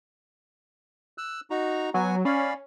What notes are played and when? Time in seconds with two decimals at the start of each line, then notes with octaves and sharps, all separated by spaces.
1.18 E6 F#6
1.50 D#4 F#4 A#5
1.94 F#3 B3 F#4 G#5
2.25 C#4 D5 F5 B5